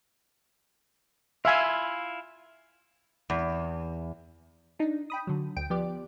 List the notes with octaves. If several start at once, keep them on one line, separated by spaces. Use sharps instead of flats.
E4 F4 E5 F5 G#5
E2
D4 D#4
G5 B5 D#6
D3 F#3
D2 G5 D7
F3 B3 G4 D5